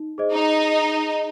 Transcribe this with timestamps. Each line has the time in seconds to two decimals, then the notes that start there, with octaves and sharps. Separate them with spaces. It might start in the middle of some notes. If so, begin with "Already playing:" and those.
Already playing: D#4
0.18 G#4 C5 D#5
0.33 D#4